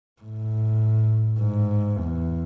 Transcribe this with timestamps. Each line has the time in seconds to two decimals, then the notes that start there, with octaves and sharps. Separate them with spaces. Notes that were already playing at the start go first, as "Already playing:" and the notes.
0.22 A2
1.40 G#2
1.99 E2